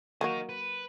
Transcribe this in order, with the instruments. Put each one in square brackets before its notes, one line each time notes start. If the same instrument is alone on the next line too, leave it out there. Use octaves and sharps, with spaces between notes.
[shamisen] F#3 A#3 F#4 [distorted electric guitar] A#4 D#5
[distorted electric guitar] B4